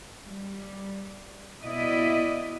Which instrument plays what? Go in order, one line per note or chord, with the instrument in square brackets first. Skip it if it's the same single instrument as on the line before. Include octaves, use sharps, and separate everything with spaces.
[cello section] G3
B2 B3 E4 D5 D#5